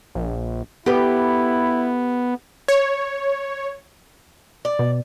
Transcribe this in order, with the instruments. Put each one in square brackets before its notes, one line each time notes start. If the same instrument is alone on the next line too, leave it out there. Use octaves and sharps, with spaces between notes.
[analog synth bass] A#1
[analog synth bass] B3 [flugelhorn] E4 [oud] G4 A4 B4
[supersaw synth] C#5
[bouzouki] D5
[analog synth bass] B2